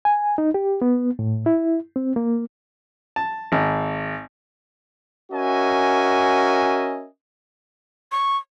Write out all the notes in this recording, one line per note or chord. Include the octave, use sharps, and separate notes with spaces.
G#5
D#4
G4
B3
A2
E4
C4
A#3
A5
G#1
C#4 F#4 A#4 D#5 E5 G#5
C#6